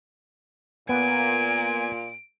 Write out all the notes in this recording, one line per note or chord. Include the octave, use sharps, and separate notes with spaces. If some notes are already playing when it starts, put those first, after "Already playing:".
A#2 B3 G#5 D7